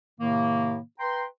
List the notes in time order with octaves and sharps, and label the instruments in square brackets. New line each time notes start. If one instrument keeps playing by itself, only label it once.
[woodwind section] A2 C3 D#3 A#3
B4 G5 A#5 C6